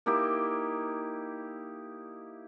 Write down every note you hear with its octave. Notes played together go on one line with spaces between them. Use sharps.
A#3 D#4 E4 G4